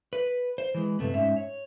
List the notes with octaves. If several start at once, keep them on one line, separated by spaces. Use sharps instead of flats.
B4
C5
E3 G#3
G2 C3 A3 B3
G#2 C#4 E5
C#5